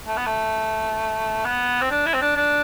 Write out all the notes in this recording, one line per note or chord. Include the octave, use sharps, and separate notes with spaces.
A3
B3
A3
B3
C4
D4
E4
C4
D4
D4